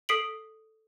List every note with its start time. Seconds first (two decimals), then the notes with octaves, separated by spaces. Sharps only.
0.09 A4 D#6 B6 C7 D7 F#7